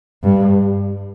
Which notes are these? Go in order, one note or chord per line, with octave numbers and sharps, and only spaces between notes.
G2